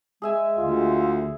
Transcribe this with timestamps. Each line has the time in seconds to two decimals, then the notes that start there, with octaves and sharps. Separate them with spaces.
0.22 G#3 G#4 E5 G#5
0.58 D2 F4